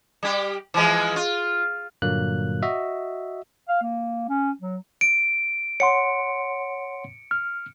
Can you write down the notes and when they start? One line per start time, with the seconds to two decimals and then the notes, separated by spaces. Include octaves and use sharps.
0.23 G3 G4
0.74 E3 F3 G#3
1.16 F4
2.02 G2 A#2 D3 F#3 A#3 F#6
2.63 F#4 D#5 E5
3.69 F5
3.82 A#3
4.29 C#4
4.61 F#3
5.01 D7
5.80 C#5 F#5 C6 C#7
7.31 F6